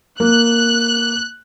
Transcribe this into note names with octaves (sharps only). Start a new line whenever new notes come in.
A#3 F#6